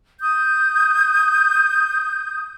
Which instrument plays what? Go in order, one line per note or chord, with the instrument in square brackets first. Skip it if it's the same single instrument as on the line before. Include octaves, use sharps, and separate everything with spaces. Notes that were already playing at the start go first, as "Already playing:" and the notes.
[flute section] D#6 G6